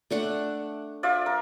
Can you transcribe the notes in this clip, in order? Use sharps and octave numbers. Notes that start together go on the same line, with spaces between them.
A3 D4 F#5
F4 D5 E5
A#4